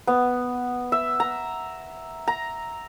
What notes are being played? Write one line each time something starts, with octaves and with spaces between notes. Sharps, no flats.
B3
E5
A#5
A#5